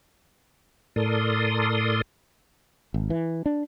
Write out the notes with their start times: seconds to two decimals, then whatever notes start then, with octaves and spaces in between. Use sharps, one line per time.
0.96 A2 A4 A#4 D5 C6 D#6
2.94 G#1
3.10 E3
3.46 D4